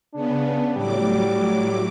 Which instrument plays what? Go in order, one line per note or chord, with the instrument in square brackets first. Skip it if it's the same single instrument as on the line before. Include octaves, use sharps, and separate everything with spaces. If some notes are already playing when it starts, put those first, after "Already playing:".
[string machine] C#3 B3 [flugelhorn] D4
[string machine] A2 F#3 D6 [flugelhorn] G3